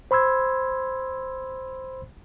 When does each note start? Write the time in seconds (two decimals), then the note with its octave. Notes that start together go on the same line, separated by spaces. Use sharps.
0.11 C5 B5 C6 E6 G#6